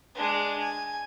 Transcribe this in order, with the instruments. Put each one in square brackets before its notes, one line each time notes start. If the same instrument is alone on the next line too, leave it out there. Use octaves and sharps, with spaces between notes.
[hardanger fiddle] G#3 D4
G#5